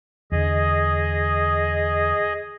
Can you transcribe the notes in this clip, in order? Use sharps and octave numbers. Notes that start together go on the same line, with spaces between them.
E2 D3 G#4 D#5